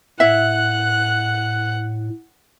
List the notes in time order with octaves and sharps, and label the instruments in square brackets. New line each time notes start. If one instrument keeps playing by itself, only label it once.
[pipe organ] A2 [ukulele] E4 E5 [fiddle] F#5 F#6